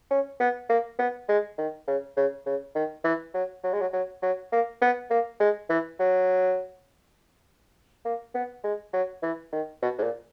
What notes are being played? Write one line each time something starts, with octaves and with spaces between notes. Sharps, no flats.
C#4
B3
A#3
B3
G#3
D#3
C#3
C#3
C#3
D#3
E3
F#3
F#3
G#3
F#3
F#3
F#3
A#3
B3
A#3
G#3
E3
F#3
A#3
B3
G#3
F#3
E3
D#3
B2
G#2
A#2